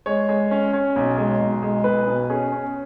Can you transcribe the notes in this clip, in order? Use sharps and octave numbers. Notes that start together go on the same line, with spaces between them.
G#3 C#5
G#3
C#4
C#4
B1
G#3
B1
G#3
B1 B4
B2
C#4 G#4
C#4